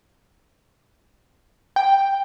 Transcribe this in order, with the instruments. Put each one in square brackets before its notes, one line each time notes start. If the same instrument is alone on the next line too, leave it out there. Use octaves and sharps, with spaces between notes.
[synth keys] G5